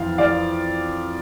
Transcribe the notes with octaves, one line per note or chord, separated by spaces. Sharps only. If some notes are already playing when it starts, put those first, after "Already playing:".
Already playing: F2 E3 F5
E3 D5 F5